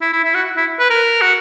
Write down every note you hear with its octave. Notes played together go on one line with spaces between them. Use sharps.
E4
E4
E4
F#4
E4
B4
A#4
F#4